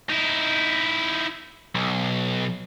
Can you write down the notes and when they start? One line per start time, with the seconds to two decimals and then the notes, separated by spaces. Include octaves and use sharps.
0.09 D#4 E4
1.75 B1